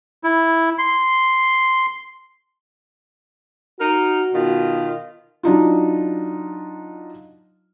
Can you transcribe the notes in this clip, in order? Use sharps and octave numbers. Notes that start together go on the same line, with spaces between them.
E4
C6
D#4 F#4 A#4
B2 D#3 F4
F#3 D4 D#4 F4